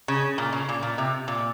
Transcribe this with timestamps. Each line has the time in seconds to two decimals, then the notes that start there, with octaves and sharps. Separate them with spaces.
0.08 C#3
0.38 A#2
0.52 C#3
0.69 A#2
0.83 A#2
0.98 C3
1.28 A#2